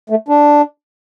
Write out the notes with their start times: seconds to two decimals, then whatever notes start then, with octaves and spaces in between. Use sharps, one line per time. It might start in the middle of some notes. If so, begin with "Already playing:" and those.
0.10 A3
0.28 D4